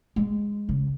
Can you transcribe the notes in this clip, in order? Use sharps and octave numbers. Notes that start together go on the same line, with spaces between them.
G#3
C#3